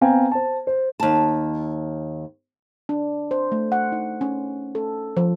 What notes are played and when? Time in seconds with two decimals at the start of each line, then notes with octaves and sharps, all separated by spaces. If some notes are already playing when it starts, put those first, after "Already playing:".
0.01 B3 C4 F5 G5 G#5 A#5
0.32 C5 A5
0.67 C5
1.00 D#2 A5
2.89 D4
3.31 C5
3.52 A3
3.72 F#5
3.92 D#4
4.21 C#4
4.75 A4
5.17 F3